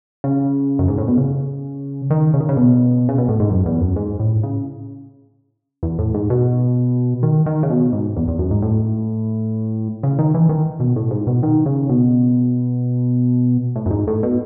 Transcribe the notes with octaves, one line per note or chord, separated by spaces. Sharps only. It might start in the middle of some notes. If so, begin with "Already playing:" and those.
C#3
F#2
G#2
A2
B2
C#3
D#3
C#3
D#3
C#3
B2
C#3
B2
A2
G#2
F#2
E2
F#2
G#2
A2
C#3
E2
A2
G#2
B2
D#3
D#3
C#3
B2
G#2
E2
E2
F#2
G#2
A2
C#3
D#3
E3
D#3
B2
A2
G#2
B2
D#3
C#3
B2
A2
F#2
G#2
A2
B2